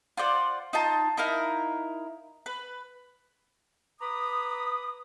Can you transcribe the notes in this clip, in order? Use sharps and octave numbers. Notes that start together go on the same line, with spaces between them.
F4 C5 D5 F#5
D#4 F4 A5 A#5
D#4 E4 A#4 F5
B4
B4 A#5 B5 D6 D#6